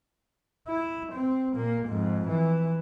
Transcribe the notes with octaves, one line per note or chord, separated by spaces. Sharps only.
E4
C4
A#2 A#3
F2 G#2
E3